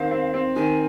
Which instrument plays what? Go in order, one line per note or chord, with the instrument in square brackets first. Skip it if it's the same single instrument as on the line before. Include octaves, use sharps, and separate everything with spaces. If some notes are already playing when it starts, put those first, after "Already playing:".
Already playing: [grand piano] D#3 C4 C5 [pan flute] F5
[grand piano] C4
C4
[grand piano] D#3 [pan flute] G#5